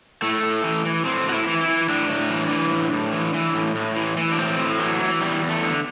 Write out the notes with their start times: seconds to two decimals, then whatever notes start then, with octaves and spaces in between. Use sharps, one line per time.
0.22 A2 A3
0.43 A2
0.64 E3
0.85 E3
1.05 A2 C4
1.26 A2 F#4
1.34 E4
1.47 E3
1.60 E4
1.68 E3
1.89 A2 D4
2.09 A2
2.30 E3
2.51 E3
2.71 A2
2.93 A2
3.13 E3
3.34 E3
3.54 A2
3.75 A2
3.96 E3
4.17 E3
4.32 D4
4.38 A2 C4
4.59 A2
4.79 E3 F#3
5.00 E3
5.21 E2 G3
5.42 E2
5.49 A3
5.63 D3